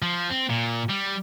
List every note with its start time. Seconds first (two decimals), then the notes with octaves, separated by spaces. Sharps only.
0.02 F3
0.30 C4
0.50 A#2
0.89 G3